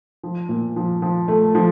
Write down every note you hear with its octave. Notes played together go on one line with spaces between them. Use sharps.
F3
A#2
F3
F3
A3
F3